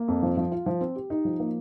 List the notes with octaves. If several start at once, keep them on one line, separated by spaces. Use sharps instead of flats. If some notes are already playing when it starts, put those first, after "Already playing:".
Already playing: A#3
F2
F3
F3
F4
F3
C4
G4
D#4
F3
A#3